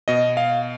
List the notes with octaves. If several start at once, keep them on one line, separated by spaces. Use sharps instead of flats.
B2 D#5
F5